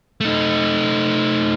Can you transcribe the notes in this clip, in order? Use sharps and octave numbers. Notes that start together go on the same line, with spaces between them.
A3 D#4